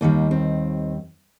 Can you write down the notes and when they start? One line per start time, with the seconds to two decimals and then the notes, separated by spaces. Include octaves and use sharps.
0.01 D#2 D#3 G3 A#3
0.31 C4